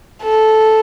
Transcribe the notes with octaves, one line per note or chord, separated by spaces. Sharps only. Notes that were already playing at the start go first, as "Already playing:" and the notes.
A4